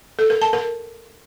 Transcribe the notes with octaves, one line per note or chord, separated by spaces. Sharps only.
A4
A#4
A5
A#4